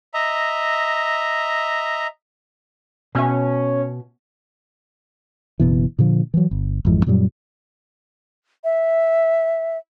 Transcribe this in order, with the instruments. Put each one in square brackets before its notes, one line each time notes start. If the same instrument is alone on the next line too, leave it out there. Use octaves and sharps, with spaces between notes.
[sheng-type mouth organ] D#5 E5 A#5
[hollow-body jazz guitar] B2 E5 [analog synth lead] C#4
[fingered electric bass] F#1 B2 E3
A#2 D3 F3
E3 F#3
G1
G#1 F2 E3 G#3
F#2 A#2 F#3 G3
[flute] E5